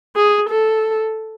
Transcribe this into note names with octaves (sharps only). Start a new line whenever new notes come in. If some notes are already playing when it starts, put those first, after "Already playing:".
G#4
A4